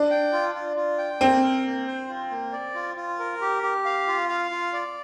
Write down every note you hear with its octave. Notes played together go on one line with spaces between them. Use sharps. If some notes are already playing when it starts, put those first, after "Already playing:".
Already playing: D4
G5
F4
F4
F4
G5
A#3 C4
A#4
A#3
C5
F4
A#3
D5
F4
F4
A#4
G4
G4
F5
F4
F5
F4
D5